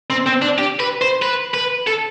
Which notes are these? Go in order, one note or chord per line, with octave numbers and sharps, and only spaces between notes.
C4
C4
D4
G4
B4
C5
B4
B4
A4